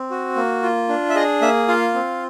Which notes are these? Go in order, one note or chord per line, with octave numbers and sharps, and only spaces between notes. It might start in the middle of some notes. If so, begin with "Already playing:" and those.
Already playing: C4
F#4
A#3
F4
D4
E5
G#4 D#5
A#3 E5
F4 F5
C4